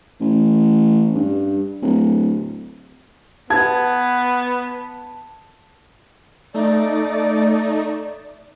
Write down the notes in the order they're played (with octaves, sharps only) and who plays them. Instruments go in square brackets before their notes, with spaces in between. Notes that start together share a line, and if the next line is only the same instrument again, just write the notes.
[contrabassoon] A1
G2
D1
[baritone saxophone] B3 [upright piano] A5 G#6
[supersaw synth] A3 D#4 [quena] D5